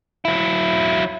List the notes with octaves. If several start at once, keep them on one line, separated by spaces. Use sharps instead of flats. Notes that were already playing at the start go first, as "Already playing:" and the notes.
F#3 E4